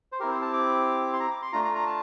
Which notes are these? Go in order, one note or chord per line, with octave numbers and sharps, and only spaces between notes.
C5
C4 E4 G4 A#4
C5
A5
D6
C6
A#5
D6
C6
A3 D4 F4 A#5
A#5
A#5
A5